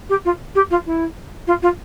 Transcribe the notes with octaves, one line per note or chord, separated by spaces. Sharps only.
G4
F4
G4
F4
E4
F4
F4